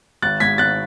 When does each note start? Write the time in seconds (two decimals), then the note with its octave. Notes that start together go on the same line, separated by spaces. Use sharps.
0.22 G#1 F#6 A6
0.40 G#2 G#6 B6
0.58 G#1 F#6 A6